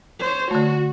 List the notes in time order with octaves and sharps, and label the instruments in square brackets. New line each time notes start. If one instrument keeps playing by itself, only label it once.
[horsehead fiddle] C5 C#5
[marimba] D3 A3 [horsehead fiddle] F#4